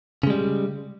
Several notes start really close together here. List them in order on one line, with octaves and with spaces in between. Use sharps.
C#3 G#3 G3